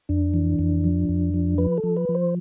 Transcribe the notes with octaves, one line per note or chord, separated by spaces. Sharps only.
F2 D4
E3
F2
F3
F2
F3
F3 B4
A4
F3
B4
F3
C5